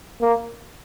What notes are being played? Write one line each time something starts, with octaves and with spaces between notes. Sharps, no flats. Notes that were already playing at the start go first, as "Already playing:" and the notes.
A#3